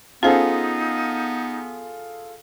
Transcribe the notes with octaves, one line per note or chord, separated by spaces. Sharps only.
B3 C#4 D#4 F4 G#4 A4 C5